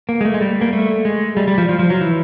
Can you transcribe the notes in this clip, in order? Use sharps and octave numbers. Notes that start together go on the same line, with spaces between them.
A#3
G#3
A3
G#3
G3
A#3
A3
G#3
G3
G3
F3
F3
F3
F#3
E3